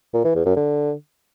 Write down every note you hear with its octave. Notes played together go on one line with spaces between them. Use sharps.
A#2
E3
E2
F#2
D3